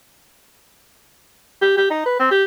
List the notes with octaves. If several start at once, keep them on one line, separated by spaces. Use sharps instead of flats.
G4
G4
D#4
B4
C4
G4